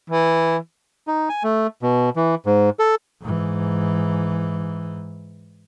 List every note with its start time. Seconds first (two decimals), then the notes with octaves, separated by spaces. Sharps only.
0.10 E3
1.07 D#4
1.29 G#5
1.43 A3
1.82 B2
2.16 E3
2.46 G#2
2.79 A4
3.22 G#2 E3